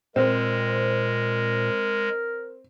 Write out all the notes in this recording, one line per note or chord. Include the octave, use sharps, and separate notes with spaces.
A#2 G#3 C4 A#4